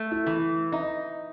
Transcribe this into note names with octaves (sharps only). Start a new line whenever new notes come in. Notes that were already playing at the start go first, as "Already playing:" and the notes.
Already playing: A3
E4
E3
D#4 E5